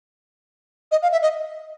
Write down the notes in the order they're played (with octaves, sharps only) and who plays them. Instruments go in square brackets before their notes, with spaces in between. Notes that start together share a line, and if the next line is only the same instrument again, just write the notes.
[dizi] D#5
F5
E5
D#5